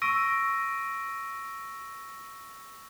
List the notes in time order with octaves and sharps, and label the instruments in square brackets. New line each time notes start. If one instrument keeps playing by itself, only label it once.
[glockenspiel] C#6 E6 A#6 D7 D#7